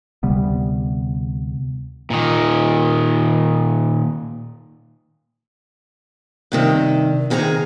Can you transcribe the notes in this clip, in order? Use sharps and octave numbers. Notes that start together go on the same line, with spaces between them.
D2 C3 G3 B3
A#2 D#3
G2 C3 D#3
C3 D#3 G#4 C#5 A#5